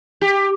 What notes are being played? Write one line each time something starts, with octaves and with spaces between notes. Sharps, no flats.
G4